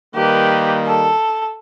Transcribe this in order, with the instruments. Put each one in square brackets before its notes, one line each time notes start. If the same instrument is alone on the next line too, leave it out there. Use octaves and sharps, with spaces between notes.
[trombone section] D#3 G3 A#3 [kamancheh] G4 B4
[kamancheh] A4